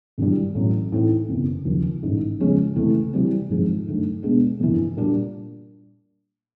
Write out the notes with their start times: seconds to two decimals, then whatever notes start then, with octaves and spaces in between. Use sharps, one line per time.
0.18 G#1 G2 E3 G3
0.55 A1 A2 F#3
0.92 A2 E3 A3 C4 D#4
1.29 F#1 E2 C3
1.65 D#2 C#3 F3
2.03 A1 G#2 D#3
2.39 E2 C#3 F3 G#3 C#4
2.76 C#2 C3 E3 A3
3.13 C3 E3 G3 C4
3.49 G#1 G#2 F3 G#3 C4
3.87 G2 D#3 F#3 A3
4.23 B2 G#3 B3 D4
4.60 G1 F2 C3 E3
4.97 A#2 G3 A#3 D4